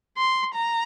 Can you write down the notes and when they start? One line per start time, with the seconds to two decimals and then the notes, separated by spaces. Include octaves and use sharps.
0.17 C6
0.55 A#5